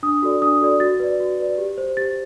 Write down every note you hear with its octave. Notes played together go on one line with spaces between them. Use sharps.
D4 D#6
F#4 A4 D5
D4 D#6
F#4 A4 D5
F#4 A6
B4 D5
F#4
B4 D5
G4
C5
G4 A6